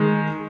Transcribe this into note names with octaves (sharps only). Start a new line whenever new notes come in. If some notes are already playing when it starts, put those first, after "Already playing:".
Already playing: D#3 G#3